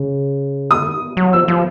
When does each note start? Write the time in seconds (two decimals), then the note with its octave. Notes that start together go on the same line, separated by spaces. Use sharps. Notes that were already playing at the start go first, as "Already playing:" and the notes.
Already playing: C#3
0.71 D3 D#6
0.86 D#3
1.17 F#3
1.33 F3 E6
1.48 F3